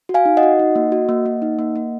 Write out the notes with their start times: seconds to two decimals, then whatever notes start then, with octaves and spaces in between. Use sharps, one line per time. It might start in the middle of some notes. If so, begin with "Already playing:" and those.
0.09 F#4
0.14 F5 G#5
0.25 D#4
0.37 D#5 F#5
0.43 F#4
0.59 D#4
0.75 A#3
0.92 F#4
1.09 A#3
1.26 A#3
1.42 D#4
1.59 A#3
1.76 A#3